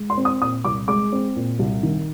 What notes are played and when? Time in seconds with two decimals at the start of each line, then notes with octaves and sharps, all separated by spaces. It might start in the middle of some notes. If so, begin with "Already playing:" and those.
Already playing: G#3
0.10 C6
0.17 C4
0.25 D#6
0.41 A#2 D#6
0.64 C2 D6
0.88 G#3 D6
1.12 C4
1.36 A#2
1.59 C2
1.83 D#3